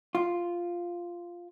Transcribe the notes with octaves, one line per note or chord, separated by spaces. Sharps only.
F4